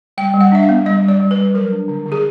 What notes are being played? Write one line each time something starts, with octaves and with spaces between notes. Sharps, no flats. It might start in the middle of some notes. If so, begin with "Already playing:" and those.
G3 G5
G3
F#5
D4 E5
F5
B3
G3 D#5
G3
D5
G3
B4
G3
F#3 A#4
D4
D3
D3
G#4